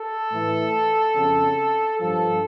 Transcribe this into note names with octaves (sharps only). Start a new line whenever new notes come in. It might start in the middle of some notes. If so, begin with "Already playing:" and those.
Already playing: A4
A2 E3
F2 C#3 F3
G2 F3 A4